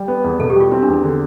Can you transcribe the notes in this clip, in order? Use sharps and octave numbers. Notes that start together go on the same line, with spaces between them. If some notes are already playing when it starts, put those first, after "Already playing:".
Already playing: G3
B3
E2
B2 A4
G4
G3
F4
C4 E4
D4
E2
E4
D3